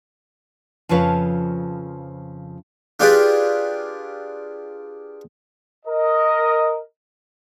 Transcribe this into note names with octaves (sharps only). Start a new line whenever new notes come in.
F2 C#3 F3 B4 C#5 F5
D4 F4 G4 G#4 B4 D5
A#4 D#5